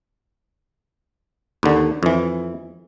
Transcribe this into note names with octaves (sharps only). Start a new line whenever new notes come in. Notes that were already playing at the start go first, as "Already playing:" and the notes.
D#2 D3
F2 E3